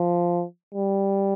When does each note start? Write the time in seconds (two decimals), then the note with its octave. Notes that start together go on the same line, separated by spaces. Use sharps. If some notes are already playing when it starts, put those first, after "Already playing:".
Already playing: F3
0.74 G3